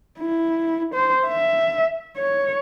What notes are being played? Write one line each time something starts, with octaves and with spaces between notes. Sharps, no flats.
E4
C5
E5
C#5